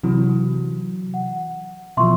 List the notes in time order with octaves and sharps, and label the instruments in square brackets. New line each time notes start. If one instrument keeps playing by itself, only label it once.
[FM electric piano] C3 E3 F#3
[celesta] F#5
[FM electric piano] B2 E3 F3 [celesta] E5 C6 C#6